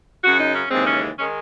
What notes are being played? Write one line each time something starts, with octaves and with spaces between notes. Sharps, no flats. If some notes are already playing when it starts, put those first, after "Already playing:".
F#2 C#3 F#3 F#4
D#4
C#4
D#2 C#3 E3 G#3 C4
C#4
D#3 G#3 C#4